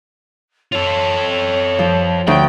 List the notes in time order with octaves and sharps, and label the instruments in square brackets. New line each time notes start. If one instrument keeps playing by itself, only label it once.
[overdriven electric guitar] F4 A4 [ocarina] C#5
[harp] F3
[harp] D2 [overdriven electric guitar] G5